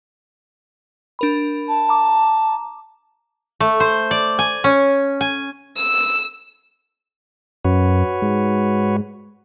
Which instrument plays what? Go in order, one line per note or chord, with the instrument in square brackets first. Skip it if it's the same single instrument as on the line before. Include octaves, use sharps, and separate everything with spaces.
[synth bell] D4 A#4 B5
[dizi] A5
[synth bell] A#5 D6
[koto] A3
C5
D5
G#5
C#4
G#5
[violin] E6
[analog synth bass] F#2 [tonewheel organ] F#4 B4 C#5
[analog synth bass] G#2